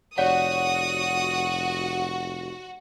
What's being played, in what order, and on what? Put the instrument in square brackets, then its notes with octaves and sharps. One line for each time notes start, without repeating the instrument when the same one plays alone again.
[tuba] F1 [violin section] F#4 [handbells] C#5 D5 F#5 [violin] D#6